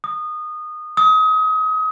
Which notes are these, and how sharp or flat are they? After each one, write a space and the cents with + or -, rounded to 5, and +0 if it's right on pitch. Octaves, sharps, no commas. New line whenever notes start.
D#6 -20
D#6 +30